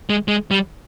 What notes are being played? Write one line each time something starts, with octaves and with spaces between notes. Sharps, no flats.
G#3
G#3
G3